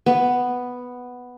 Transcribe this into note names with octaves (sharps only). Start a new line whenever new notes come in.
B3